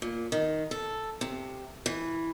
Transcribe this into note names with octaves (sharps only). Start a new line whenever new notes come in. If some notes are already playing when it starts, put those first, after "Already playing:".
A#2
D#3
A4
C3
E3